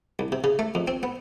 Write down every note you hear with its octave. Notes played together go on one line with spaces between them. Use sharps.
C2
C3
C#3
A3
F2
C4
B3